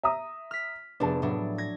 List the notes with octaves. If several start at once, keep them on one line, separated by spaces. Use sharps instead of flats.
E5 A#5 D#6
F6 B6
F1 B3 D4 G#4 A5
A2 F#3 D4
G#6 A#6